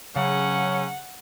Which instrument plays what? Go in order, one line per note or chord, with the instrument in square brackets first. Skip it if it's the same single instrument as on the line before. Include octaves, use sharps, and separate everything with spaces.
[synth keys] C#3 [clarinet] F#3 [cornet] C#4 [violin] F#5